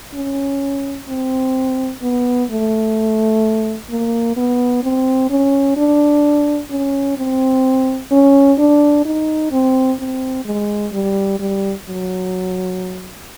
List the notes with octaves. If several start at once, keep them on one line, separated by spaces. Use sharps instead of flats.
C#4
C4
B3
A3
A#3
B3
C4
C#4
D4
C#4
C4
C#4
D4
D#4
C4
C4
G#3
G3
G3
F#3